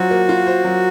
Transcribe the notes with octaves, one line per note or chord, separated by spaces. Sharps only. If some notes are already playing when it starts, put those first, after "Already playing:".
Already playing: F#3 F4 F#4 C5
A#3
F4
C5
F#3